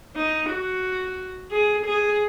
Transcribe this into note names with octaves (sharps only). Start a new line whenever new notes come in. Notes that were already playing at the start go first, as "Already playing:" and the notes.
D#4
F#4
G#4
G#4